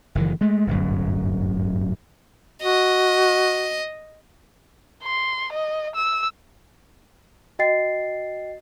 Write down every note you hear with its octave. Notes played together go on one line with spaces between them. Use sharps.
F#1 D#3 E3
G#3 A3
D1 G1 F#2
F#4 D#5
C6
D#5
E6
F#4 D#5 G5 A6 C7